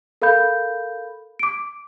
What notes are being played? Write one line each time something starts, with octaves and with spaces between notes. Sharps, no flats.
A4 A#4 F5 B5 G6
D6 D7